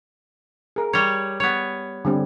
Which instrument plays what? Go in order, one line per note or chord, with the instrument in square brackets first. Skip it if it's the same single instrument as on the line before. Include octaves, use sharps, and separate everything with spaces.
[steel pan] G#4 A#4
[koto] G3 C#5
B3 C#5
[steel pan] D3 G3 C4